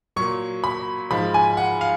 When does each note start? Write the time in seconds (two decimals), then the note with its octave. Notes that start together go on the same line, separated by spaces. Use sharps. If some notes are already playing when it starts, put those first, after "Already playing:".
0.16 A#2 F#3 C#6
0.64 B5
1.11 G#2 F3 G#3 B5
1.34 G#5
1.57 F#5
1.81 F5